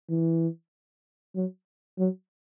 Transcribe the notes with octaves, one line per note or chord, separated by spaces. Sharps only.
E3
F#3
F#3